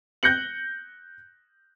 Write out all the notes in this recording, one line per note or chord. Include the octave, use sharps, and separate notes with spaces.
F#6 G6 A#6 C#7 F#7